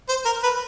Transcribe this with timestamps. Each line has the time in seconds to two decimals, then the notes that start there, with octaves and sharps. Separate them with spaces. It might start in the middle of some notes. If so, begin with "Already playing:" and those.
0.09 C5
0.25 A#4
0.43 B4